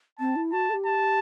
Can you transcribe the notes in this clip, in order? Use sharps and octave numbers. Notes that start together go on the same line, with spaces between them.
C4 A5
E4
F#4 A5
A4
G4
A5